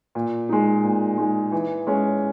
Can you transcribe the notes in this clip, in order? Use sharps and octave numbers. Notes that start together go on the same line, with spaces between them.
A#2
G#3 D#4
A#2
G#3 D#4
E3
G#3 C#4